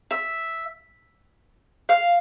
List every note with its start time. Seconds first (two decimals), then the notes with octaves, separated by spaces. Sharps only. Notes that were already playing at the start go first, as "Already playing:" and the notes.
0.11 E5
1.89 F5